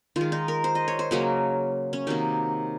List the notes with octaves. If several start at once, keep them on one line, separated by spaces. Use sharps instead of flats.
D#3 F4
G#3
D#4
A#4
C5
D#5
C#5
C5
C#3 F#3 A#3 C#4
C#4
C3 D#3 F#3 A#3 D#4